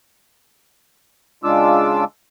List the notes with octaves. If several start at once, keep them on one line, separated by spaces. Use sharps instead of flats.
C#3 G#3 D4 F4 D6 E6